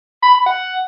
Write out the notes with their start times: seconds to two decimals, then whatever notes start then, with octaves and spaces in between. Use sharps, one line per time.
0.23 B5
0.34 B5
0.46 F#5